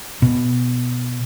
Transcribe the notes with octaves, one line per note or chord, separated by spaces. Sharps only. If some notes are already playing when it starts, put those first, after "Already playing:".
B2